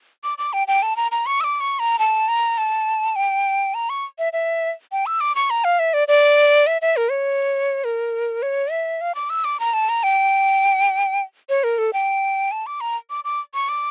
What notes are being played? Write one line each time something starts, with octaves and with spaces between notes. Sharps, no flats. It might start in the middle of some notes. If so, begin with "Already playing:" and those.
D6
D6
G5
G5
A5
A#5
A#5
C#6
E6
D6
C#6
A#5
A5
A#5
A5
G5
A#5
C#6
E5
E5
G5
E6
D6
C#6
A#5
F5
E5
D5
D5
E5
E5
A#4
C#5
A#4
C#5
E5
F5
D6
E6
D6
A#5
A5
A#5
G5
C#5
A#4
A4
G5
A5
D6
A#5
D6
D6
C#6
D6